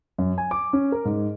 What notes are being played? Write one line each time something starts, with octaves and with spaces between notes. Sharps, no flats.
F#2
G#5
D6
C#4
A#4
G#2